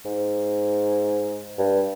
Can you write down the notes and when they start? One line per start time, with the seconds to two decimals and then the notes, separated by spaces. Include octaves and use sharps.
0.05 G#2
1.58 G2